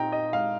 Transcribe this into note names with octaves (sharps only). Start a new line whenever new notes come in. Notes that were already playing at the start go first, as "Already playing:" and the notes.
Already playing: A#2 C4 D#4 G5 A#5
D#5
G#3 F5